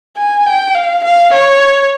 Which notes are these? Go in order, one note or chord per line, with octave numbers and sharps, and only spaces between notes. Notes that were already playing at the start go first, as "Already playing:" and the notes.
G#5
G5
F5
F5
C#5